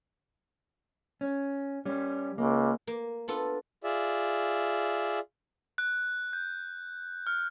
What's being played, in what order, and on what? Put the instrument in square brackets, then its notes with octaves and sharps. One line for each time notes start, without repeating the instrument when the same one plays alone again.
[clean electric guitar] C#4
G3 C#4
[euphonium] C#2 [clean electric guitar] A#3
[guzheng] A#3
B3 D4 F4 A4
[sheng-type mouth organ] F4 G#4 D5 E5
[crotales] F#6
G6
F6